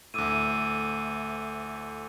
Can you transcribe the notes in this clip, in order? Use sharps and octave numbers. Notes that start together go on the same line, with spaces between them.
D2 A2 D6 E6 D#7